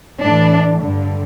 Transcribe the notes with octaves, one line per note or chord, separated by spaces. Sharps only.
A2 E3 D4
G2 D3